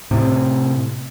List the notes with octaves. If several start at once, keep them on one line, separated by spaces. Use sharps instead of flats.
A2 C3